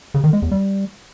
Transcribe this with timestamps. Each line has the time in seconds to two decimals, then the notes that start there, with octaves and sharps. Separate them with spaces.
0.14 C#3
0.24 D#3
0.33 G#3
0.42 E2
0.51 G3